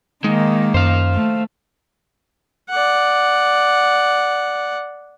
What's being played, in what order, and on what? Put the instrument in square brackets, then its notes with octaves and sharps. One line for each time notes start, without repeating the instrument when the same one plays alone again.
[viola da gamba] D#3 A#3 [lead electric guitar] G#3 D#4
[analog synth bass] F#2 [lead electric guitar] C5 F5
[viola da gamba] A3
[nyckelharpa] D5 F#5